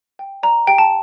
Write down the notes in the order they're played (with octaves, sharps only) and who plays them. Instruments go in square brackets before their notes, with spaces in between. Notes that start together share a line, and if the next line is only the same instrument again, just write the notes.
[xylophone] G5
D5 A#5
G4 G5
A5